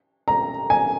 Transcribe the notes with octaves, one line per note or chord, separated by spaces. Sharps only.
A#5
G#5